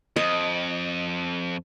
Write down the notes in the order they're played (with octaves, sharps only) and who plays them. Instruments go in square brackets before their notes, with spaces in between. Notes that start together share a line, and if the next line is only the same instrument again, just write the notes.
[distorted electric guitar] F2 [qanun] D#5